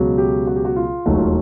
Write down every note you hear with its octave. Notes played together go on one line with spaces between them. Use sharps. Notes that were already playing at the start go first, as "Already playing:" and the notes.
Already playing: C#2 B2 F#3
G4
F#4
G4
F#4
F4
E1 D#2 D#3 F#3 A3 F#4
F4